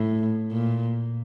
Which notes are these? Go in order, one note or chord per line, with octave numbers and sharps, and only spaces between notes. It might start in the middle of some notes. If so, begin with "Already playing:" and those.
Already playing: A2
A#2